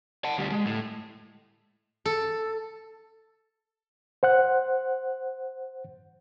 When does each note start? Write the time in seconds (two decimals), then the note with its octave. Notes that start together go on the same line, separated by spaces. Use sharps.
0.25 F#5 A5
0.38 D2 G3
0.52 G#3
0.66 A2
2.05 A4
4.23 C5 F#5 F#6